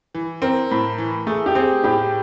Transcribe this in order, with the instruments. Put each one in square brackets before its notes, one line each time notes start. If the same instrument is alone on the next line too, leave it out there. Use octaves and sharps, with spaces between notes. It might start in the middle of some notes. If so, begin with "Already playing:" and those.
[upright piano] E3
[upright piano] C4 [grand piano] A#4
[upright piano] A2
E3
[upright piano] A3 [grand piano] G#4
[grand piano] G4
[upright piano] C4 [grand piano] G#4
[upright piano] A2 [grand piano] G4